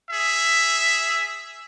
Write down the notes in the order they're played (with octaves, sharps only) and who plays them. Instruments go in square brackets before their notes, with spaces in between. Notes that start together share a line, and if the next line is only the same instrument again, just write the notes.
[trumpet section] G#4 E5